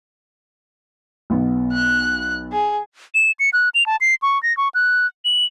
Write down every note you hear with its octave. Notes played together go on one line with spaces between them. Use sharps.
B1 B3
F#6
G#4
E7
C#7
F#6
F7
A5
C7
C#6
A#6
C#6
F#6
F#7